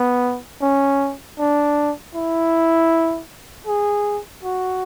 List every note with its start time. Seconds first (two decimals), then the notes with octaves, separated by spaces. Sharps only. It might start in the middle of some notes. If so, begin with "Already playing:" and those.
Already playing: B3
0.62 C#4
1.39 D4
2.15 E4
3.67 G#4
4.43 F#4